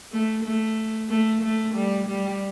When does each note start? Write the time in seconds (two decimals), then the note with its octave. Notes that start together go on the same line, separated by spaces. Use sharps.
0.12 A3
0.44 A3
1.09 A3
1.42 A3
1.75 G3
2.07 G3